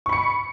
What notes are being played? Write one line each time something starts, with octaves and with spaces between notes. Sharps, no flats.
B5 C#6 C#7